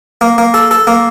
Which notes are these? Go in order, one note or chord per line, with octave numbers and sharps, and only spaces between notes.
A#3
A#3
A4
A4
A#3